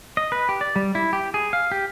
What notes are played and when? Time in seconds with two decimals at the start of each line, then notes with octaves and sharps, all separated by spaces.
0.17 D#5
0.32 B4
0.49 G4
0.61 D5
0.76 G3
0.95 E4
1.13 G4
1.34 G#4
1.53 F5
1.72 G4